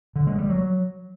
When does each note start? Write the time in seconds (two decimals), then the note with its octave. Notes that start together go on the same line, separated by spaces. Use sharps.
0.16 D3
0.27 G#3
0.38 G3
0.50 F#3